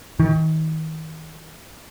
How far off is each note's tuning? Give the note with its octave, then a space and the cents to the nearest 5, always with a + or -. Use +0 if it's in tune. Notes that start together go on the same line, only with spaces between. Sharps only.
D#3 +35